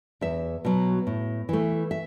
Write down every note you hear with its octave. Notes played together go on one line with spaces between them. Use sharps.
E2 E5
B2 F#3
A2
E3 A3
E5